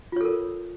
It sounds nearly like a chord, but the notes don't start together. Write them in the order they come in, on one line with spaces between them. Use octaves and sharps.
F4 C#5 A4 A#4